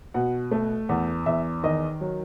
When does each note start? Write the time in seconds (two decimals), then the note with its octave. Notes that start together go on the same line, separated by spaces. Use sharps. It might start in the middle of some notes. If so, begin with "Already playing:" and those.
0.14 B2 F#5
0.51 A3
0.89 E2 F#5
1.26 E2 E5
1.63 D#3 D#5
2.01 F#3